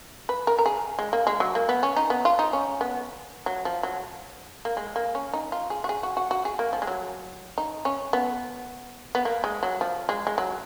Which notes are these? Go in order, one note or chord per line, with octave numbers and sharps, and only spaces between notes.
B4
A#4
A#4
G#4
G#3
A#3
G#3
F#3
A#3
B3
C#4
D#4
B3
F4
D#4
C#4
B3
F#3
F3
F#3
A#3
G#3
A#3
C#4
D#4
F4
G#4
F#4
G#4
F#4
F#4
F#4
G#4
A#3
F3
G#3
F#3
D#4
C#4
B3
B3
A#3
G#3
F#3
F3
G#3
G#3
F#3